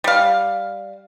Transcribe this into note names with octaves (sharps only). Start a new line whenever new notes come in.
G3 F5